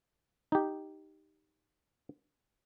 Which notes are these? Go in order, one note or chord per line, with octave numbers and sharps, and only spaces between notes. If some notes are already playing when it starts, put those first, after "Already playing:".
D#4 G4